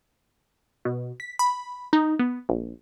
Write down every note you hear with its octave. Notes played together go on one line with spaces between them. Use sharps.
B2
B6
B5
D#4
B3
A#1